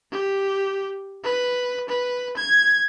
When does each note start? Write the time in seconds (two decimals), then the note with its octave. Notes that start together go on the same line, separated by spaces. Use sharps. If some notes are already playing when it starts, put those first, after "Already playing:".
0.12 G4
1.24 B4
1.89 B4
2.37 G#6